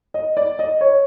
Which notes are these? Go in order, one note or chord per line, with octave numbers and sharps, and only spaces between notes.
D#5
D5
D#5
C#5